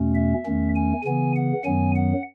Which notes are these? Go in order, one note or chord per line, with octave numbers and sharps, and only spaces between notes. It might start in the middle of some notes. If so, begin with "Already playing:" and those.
Already playing: E2 B2 A3 C#4
E5
E2 D#3 A3 C#4
G#5
C#3 E3 B3 G#5
F#5
F#2 D#3 F#3 B3 G#5
F#5